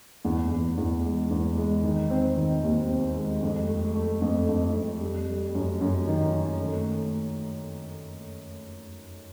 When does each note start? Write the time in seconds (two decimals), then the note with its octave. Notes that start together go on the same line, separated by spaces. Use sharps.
0.25 E2
0.51 E2
0.77 E2
1.05 G#3
1.31 E2
1.57 G#3
1.83 D#3
2.10 C4
2.37 D#3
2.63 D#2
2.89 C4
3.16 G#3
3.43 F2
3.68 A3
3.96 A3
4.22 F2
4.49 F2
4.74 F2
5.01 G3
5.28 G3
5.55 F#2
5.81 F#2
6.07 D#3
6.33 D#3
6.60 A3
6.87 A3